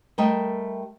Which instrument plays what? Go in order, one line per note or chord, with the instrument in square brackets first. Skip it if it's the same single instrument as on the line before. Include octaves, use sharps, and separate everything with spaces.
[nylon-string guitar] G3 A3 A#4 D#5 E5 G5